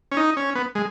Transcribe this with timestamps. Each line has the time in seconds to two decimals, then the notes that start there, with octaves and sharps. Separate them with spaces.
0.12 C#4
0.17 D#4
0.37 C#4
0.55 B3
0.75 G#3